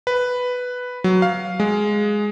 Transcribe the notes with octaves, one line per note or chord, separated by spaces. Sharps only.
B4
F#3
F5
G#3